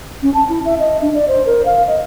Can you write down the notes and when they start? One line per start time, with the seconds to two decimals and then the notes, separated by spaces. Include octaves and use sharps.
0.23 C#4
0.34 A5
0.49 E4
0.65 E5
0.80 D#5
1.01 D4
1.14 D5
1.28 C5
1.46 A#4
1.65 F5
1.88 D#5